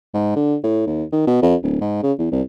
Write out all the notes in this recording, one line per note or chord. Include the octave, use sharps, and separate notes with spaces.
G#2
D3
A2
D#2
D#3
B2
F2
D1
G#2
C#3
E2
C2